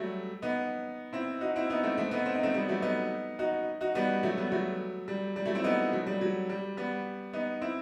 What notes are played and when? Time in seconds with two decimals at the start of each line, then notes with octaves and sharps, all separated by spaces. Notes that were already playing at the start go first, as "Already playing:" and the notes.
Already playing: F#3 G3 A3
0.42 B3 D#4
1.13 C4 E4
1.41 D#4 F#4
1.56 C4 E4
1.70 B3 D#4
1.83 A3 C4
1.97 A3 C4
2.11 B3 D#4
2.26 C4
2.35 D#4
2.43 A3 C4
2.54 G3 B3
2.68 F#3 A3
2.82 B3 D#4
3.39 D#4 F#4
3.81 D#4 F#4
3.95 G3 B3
4.23 F#3 A3
4.37 G3 B3
4.52 F#3 A3
5.08 G3
5.36 G3
5.45 F#3 A3
5.55 C4 E4
5.64 B3 D#4
5.92 F#3 A3
6.06 G3
6.21 F#3
6.49 G3
6.77 G3 B3
7.33 B3 D#4
7.61 C4 E4